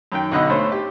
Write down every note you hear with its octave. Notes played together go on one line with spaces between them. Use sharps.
F#2 D#3 G5
B1 B2 D3 D#5 F#5 E6
G#1 A3 C#4 C5
G4